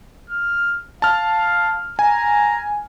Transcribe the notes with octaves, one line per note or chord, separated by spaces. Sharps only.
F6
F5 A5 F6
G#5 A#5